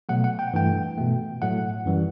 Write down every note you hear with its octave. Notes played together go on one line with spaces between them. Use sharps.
B2 F#3 A3 F#5
F#5
G5
G2 E3 A3 G5
B2 A3
A2 F#3 A3 F#5
F#2 E3 G3